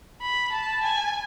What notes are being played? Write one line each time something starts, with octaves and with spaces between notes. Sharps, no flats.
B5
A5
G#5